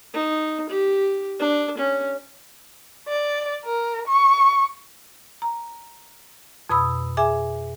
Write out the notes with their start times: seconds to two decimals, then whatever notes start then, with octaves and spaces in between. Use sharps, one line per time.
0.14 D#4
0.69 G4
1.39 D4
1.77 C#4
3.08 D5
3.65 A#4
4.07 C#6
5.42 A#5
6.69 F2 B2 B5 D#6 E6
7.17 G#4 E5 G#5 D6